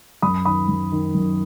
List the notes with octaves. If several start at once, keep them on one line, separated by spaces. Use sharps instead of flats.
F#2 B5 D#6
D#3 B5 D#6
F#2
D#3
F#2